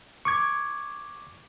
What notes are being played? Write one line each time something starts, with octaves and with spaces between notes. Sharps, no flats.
C#6 D6 G#6